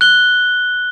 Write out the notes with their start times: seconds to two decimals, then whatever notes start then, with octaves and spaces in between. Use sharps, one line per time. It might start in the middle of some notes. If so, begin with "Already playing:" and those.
0.01 F#6 G7